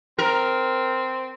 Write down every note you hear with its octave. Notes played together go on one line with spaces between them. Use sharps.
C4 A#4